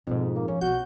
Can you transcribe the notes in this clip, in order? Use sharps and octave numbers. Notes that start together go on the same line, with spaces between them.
F2 G#2 B2 A#3
A#1 A#3
F3 C#4
B1 F#4 G6